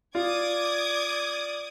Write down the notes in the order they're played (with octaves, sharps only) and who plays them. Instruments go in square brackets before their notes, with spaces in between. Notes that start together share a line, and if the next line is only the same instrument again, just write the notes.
[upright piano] F4 [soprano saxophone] D5 [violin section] D6 D#6 G#6